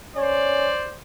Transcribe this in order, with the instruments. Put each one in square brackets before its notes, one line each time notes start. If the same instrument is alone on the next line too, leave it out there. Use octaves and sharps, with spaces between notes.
[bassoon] C#4 [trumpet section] C5 D5